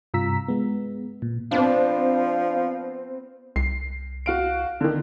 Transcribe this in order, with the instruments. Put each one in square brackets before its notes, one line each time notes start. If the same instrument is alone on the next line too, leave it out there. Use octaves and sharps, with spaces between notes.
[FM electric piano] G2 C3 F4 A#5 E6 B6
G#3 B3
A#2
[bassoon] F3 [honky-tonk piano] B3 C4 [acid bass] D4
[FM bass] C2 [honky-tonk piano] C7
[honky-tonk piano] F#4 F5 D7
D3 D#3